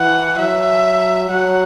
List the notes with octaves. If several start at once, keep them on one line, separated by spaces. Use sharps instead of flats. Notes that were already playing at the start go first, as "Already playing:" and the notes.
Already playing: E3 F#5
F#3 E5
F#3 F#5